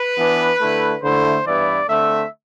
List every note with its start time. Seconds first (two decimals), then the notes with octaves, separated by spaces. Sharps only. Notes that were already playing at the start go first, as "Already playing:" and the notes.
Already playing: B4
0.17 E3 B3 D4
0.60 D3 A3 E4
1.03 D3 A3 E4 C5
1.46 G2 E3 B3 E4 D5
1.89 D3 A3 C4 E5